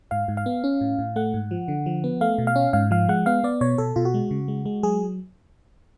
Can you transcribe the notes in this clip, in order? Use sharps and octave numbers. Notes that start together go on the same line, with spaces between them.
G#2 F5
G#2
F5
B3
C#4
A2
A2
A3 F#5
G#2
F3
D3
F3
B3
A3 F5
B2
F5
C#4
G#2 F5
F3 F5
G#3 F#5
B3 F5
B3 D5
B2 C#5
B2 A4
B2 F4
F#4
G#3
C#3
G#3
G#3
F#3 G#4